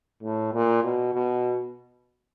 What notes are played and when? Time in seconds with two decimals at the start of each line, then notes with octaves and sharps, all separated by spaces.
0.23 A2
0.53 A#2
0.83 B2
1.13 B2